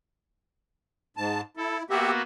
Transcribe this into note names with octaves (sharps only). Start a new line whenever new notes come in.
G#2 A5
E4 A4
A#3 B3 F#4 G4 E5